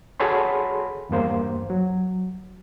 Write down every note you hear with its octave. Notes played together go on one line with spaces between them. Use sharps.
F#4 G#4 A4 C#5 B5 C6
E2 G2 A#3 C5
F#3